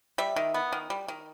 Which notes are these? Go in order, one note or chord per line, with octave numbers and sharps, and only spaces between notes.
G3 E5
D#3
B3
D#3
G3
D#3